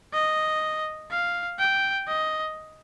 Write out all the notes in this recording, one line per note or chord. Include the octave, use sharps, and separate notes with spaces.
D#5
F5
G5
D#5